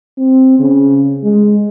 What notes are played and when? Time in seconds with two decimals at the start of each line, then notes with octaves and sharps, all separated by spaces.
0.18 C4
0.59 C#3
1.24 G#3